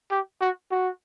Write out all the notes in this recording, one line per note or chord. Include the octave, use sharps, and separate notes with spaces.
G4
F#4
F#4